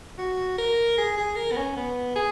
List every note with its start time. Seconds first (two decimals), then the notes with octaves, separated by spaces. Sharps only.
0.18 F#4
0.58 A#4
0.98 G#4
1.17 G#4
1.36 A#4
1.52 B3
1.56 C#4
1.76 B3
2.16 G#4